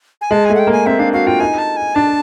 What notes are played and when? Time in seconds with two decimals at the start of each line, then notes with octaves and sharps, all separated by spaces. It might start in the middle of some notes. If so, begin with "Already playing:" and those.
0.21 G#5
0.31 G#3 A5
0.45 A3 G#5
0.55 F#5
0.59 G5
0.67 A#3 G#5
0.86 C4 E5
0.99 D4 F5
1.13 F#4 F5
1.27 F4 G5
1.40 D#4 G#5
1.58 A5
1.77 G#5
1.95 D4 A5